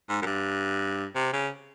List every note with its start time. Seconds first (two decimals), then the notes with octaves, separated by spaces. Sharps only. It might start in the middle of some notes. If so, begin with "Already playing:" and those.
0.09 G#2
0.21 F#2
0.26 G2
1.15 C3
1.33 C#3